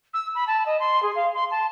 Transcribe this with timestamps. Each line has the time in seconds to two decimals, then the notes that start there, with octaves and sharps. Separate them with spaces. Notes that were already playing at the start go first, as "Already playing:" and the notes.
0.14 E6
0.35 B5
0.47 A5
0.66 D#5
0.80 C6
1.03 G#4
1.16 F5
1.34 C6
1.51 A5